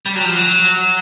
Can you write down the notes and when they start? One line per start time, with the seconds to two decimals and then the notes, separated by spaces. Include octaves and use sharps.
0.06 G3
0.15 F#3
0.25 F3
0.36 F#3